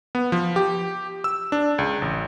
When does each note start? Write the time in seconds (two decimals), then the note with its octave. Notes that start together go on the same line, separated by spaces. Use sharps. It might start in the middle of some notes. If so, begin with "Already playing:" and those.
0.15 B3
0.32 F3
0.56 G4
1.24 E6
1.52 D4
1.78 C#2
2.02 A1